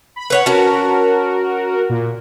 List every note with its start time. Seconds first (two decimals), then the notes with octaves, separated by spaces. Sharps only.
0.16 B5
0.30 B4 C#5 F#5
0.46 C#4 F#4 A#4 A5
1.89 A#2